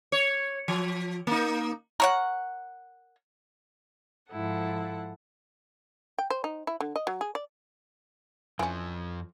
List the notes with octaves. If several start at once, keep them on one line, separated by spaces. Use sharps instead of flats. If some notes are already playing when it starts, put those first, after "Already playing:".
C#5
F3
A#3 D#4
A#4 C#5 F#5
G#2 F3 E4 A4 F#5
G5
C5
D#4
E4
D3
D#5
F#3
G#4
D5
F2 E3 F3 C#4